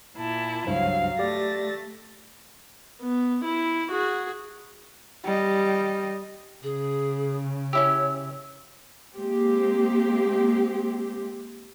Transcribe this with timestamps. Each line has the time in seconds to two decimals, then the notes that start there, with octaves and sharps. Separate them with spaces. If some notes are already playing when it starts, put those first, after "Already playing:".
0.17 A#2 E4 A5
0.67 C#2 G2 F#3 C5 F5
1.19 A3 G4 D5 A6 A#6
3.01 B3
3.44 E4
3.91 F#4 G#4
5.24 G3 D#5
6.63 C#3 G#4
7.73 C#4 E4 G4 C#5 E6
9.17 G#3 A#3 C4 G4